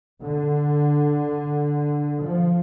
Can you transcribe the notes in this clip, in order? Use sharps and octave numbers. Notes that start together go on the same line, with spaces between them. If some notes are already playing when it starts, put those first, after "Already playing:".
D3
F3